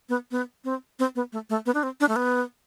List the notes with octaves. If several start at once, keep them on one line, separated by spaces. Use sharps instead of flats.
B3
B3
C4
C4
B3
A3
A3
B3
D4
C4
D4
A3
B3